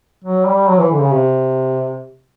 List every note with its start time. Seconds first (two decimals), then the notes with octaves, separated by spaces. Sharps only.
0.24 F#3
0.47 G3
0.69 F#3
0.79 E3
0.91 D3
1.01 C#3
1.12 C3